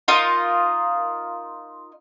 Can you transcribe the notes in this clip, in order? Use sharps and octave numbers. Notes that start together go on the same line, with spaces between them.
D#4 F4 A#4 D#5